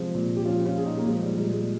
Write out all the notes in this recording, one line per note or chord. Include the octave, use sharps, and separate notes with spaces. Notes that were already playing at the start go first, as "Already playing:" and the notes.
Already playing: C3 F3 G#3 C4
A#2
G4
F3 C#4 F4
C#4 F4
A#2 G#4
D#4 G4
A#3
F3 G#3
G3
A#2 G#3
G#3